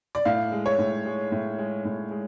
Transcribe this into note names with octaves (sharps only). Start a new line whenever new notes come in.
D5
A2 F5
G#3
C#5
A2
G#3
A2
G#3
A2
G#3